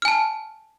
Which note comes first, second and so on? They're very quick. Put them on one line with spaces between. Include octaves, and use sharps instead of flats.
F6 G#5 A5